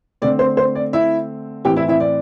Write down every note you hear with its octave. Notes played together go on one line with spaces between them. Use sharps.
D3 A3 C4 D5
C5
C5
D5
E4 E5
A2 E3 C4 G4 G5
E4 E5
E4 E5
D5